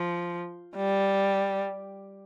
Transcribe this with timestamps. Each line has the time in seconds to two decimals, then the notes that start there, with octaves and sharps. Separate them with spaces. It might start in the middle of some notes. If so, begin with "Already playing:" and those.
Already playing: F3
0.76 G3